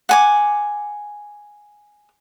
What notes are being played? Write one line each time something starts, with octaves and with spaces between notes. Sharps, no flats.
F#5 G#5 D6